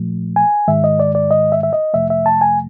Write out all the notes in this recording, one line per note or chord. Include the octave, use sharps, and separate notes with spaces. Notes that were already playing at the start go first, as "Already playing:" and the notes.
Already playing: A#2 F3 A3
G#5
G#2 D#3 G#3 E5
D#5
D5
D5
D#5
E5
E5
D#5
F2 C3 F3 A3 E5
E5
A5
G#5